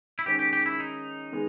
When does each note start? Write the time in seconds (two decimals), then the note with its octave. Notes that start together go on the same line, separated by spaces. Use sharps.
0.19 E4
0.26 D#3 G#3 C#4 G4 G#4
0.39 G4
0.53 G4
0.66 E4
0.80 D#4
1.32 D#3 G#3 B3